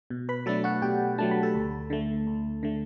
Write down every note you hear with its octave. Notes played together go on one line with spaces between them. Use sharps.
B2
B4 B5
F#3 A3 D4 A4 A5
F#4 F#5
B2 G4 G5
F#3 A3 D4 A5
B5
A4 A5
D2
D3 A3
D2
D3 A3